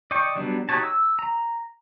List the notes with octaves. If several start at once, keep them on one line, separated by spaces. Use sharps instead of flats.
D5 D#5 G5 C#6
F#3 G3 B3 D4
D#4 F#4 G4 C#5 A5
E6
A#5